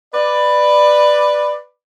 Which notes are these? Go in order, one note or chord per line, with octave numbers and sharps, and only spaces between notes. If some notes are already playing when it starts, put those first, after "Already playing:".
B4 D5